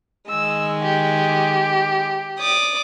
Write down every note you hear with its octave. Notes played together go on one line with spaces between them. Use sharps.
D#3 G#3 E6
G4
D5 D6 D#6